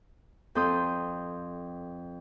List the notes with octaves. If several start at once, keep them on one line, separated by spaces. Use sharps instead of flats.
F2 C4 A4 C6 D#6 G6